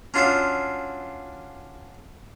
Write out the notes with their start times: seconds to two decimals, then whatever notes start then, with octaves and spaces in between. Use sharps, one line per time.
0.14 C#4 D4 F4 F#4 E5 F5